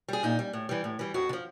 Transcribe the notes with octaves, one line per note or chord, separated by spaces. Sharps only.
G3 G#4
A#2 D#4
G3
A2
E3 G3
A2
E3 G3
F2 F#4
D3
F3